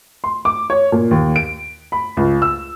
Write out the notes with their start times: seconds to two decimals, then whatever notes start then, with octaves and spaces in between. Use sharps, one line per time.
0.24 C6
0.45 D6
0.70 C#5
0.92 A#2
1.11 D#2
1.36 D7
1.92 B5
2.17 C#2
2.42 E6